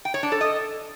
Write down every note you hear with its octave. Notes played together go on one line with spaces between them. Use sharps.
G5
C#5
D4
A4
D#5